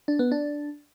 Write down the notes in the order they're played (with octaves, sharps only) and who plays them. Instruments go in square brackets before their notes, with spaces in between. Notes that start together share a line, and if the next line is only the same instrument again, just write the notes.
[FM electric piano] D4
B3
D4